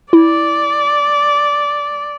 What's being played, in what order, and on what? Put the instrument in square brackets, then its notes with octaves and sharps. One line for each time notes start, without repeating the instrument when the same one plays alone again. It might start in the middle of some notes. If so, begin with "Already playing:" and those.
[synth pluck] E4 [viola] D5